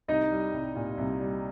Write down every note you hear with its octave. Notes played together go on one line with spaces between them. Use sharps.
C2 D#4 D#5
G3
C2
A#2
C2
G3